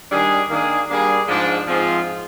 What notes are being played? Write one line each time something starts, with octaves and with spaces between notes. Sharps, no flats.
D#3 G3 D4 G#4
D#3 A#3 D4 G#4
G3 A#3 D4 G#4
G#2 F3 G#3 D4
G#2 F3 C4 F4 G#4